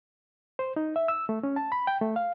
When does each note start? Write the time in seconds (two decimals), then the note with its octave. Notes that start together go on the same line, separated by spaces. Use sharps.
0.59 C5
0.76 D#4
0.96 E5
1.08 E6
1.29 A3
1.43 C#4
1.56 A5
1.72 B5
1.87 G5
2.01 A3
2.16 F5